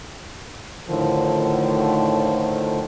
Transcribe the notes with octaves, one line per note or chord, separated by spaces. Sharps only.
A2 D3 D#3 F3